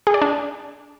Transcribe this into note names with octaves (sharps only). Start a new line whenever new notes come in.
G#4
D5
D4